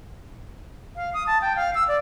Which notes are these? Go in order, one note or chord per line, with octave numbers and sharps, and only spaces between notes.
F5
D#6
A5
G5
F5
E6
D5